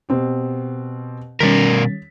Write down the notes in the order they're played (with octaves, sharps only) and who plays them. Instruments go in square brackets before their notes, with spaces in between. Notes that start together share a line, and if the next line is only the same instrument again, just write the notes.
[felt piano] B2 C4 G4
[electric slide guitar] B2 A#4 [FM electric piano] D#3 G3 C#4 [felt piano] A6 B6